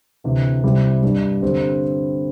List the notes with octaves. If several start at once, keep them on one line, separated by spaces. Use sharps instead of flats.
D2 C3 E3
C2 C3 G3 C4 E4
G2 G3 D4
G2 D3 C4 G4